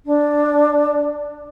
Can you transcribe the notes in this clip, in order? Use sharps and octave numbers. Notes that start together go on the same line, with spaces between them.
D4